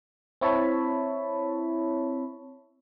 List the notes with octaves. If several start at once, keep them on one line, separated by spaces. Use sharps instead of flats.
C4 E4 C#5 E5 A5 B5